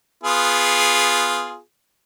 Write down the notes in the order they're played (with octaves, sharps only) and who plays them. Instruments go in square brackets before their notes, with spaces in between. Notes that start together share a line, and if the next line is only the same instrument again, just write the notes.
[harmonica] B3 F4 G#4